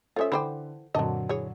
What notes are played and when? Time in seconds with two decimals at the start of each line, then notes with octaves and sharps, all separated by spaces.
0.16 C#4 F4 A4 C5 C#5 E5 D#6
0.32 D3 E3 C5 G5 B5 D6
0.95 F#2 A#2 D3 F#3 C4 D#5 A5
1.29 E3 G#4 C#5